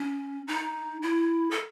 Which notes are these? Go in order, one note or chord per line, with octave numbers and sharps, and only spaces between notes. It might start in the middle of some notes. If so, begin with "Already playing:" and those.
Already playing: C#4
D#4
E4
A4